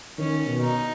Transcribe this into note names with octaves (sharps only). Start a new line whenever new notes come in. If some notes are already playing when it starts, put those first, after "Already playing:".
D#3 C#4
B2
D#4